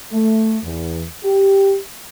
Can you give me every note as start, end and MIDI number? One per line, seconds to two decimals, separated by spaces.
0.12 0.57 57
0.63 1.04 40
1.24 1.77 67